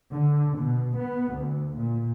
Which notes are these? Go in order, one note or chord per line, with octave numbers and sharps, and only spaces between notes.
D3
B2
B3
D2
A#2